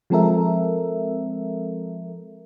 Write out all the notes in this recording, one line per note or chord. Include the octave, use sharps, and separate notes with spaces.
F3 G#3 C4 A4 A#4 E5